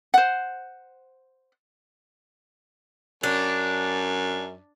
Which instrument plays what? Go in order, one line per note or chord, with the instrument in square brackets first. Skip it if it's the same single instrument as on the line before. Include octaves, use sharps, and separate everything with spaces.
[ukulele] C5 F#5
[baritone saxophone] F#2 [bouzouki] D4